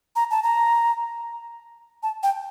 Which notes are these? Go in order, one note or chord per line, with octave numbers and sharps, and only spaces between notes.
A#5
A5
A#5
A5
G5